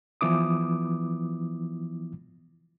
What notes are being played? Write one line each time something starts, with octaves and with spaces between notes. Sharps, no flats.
E3 F3 B3 E4 D6 D#6